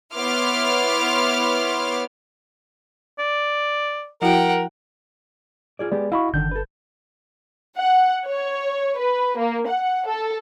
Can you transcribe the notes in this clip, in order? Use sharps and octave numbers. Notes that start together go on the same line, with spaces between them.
B3 E4 C#5 C6 D6 F6
D5
F3 E4 F#4 A#4 F#5 G5
F4 G#4 D5
G#3 B3 G4 G#4 D5
E4 F#4 D#5 F5 B5 C#6
G1 D3 D#3 D4 G6
A4 B4
F#5
C#5
B4
A#3
F#5
A4